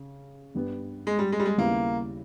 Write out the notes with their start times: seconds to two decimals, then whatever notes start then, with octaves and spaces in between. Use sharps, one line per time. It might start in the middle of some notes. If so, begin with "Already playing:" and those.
Already playing: C#3
0.55 G2 G3 B3
1.07 G#3
1.19 G3
1.32 G#3
1.39 G3
1.46 G#3
1.58 D#2 C#3 G3 A#3 B3 E4